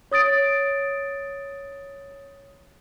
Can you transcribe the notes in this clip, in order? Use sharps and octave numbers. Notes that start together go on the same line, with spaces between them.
C#5 D#6 A6 D7